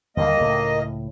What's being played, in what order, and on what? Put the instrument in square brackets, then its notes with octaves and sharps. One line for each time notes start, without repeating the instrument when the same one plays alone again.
[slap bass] D#2 D3 G3 [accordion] A#3 D#5
[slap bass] C#2 A2